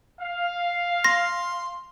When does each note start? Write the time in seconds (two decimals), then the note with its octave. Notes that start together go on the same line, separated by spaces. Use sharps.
0.21 F5
1.04 C6 A#6